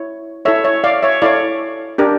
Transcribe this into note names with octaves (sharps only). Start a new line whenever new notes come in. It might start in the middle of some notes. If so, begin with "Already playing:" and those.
Already playing: E4 C#5
E4 A4 C#5 E5
C#5 E5
D5 F5
C#5 E5
E4 A4 C#5 D5 F5
D4 G4 A#4